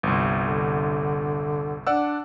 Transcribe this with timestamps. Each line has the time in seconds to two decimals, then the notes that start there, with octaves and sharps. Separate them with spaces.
0.03 G1 C2
0.40 D3
1.87 D4 D5 F#5 E6